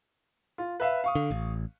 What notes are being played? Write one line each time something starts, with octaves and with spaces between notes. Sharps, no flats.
F4
B4 E5 F5
F5 C#6 D#6
D3
A1